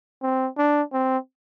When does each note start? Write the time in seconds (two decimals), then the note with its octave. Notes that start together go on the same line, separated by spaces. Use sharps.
0.23 C4
0.57 D4
0.93 C4